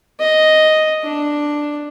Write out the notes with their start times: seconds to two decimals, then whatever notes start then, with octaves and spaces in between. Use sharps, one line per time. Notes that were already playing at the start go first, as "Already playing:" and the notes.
0.20 D#5
1.03 D4